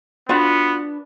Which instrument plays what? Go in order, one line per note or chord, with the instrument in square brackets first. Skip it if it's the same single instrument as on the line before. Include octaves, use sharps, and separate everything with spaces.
[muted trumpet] B3 [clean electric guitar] D4 B4 [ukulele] F4 F#4